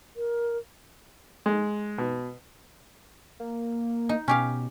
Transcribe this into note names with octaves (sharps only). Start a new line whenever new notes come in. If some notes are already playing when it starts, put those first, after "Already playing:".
A#4
G#3
B2
A#3
D#4
B2 C#4 G4 F5